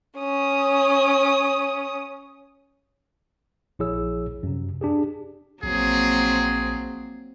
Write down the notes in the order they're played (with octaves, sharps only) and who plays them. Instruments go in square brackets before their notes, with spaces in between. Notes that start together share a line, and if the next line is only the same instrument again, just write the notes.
[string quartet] C#4 D#6
[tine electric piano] A#1 F3 E4 G#4 C#5 E6
F#2 C3
D4 G4 G#4
[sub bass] A#1 [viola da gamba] F#3 A#3 C4 [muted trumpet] G#4